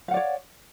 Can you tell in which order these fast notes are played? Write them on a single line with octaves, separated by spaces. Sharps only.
F5 F#5 D5 C#5